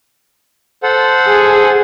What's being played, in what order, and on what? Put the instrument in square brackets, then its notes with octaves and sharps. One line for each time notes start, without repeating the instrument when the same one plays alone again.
[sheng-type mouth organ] A4 C5 F#5
[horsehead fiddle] G#4